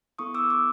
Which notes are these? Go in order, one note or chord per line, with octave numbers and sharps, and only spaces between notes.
B3 E4 A4 C#6 D#6
D6 E6
D6 E6